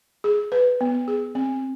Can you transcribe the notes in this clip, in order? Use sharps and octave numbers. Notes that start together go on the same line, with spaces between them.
G#4
B4
B3
G#4
C4